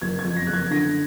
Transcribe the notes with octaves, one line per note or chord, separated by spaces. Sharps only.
F#1 G#6
G#6
F2
A#6
F#1 F#6
G#6
D3 A#6